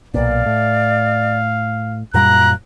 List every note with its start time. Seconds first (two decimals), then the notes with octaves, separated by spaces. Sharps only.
0.14 B1 A#2 D5 F5
0.46 A2
2.14 F#2 A#2 G3 A#5 F#6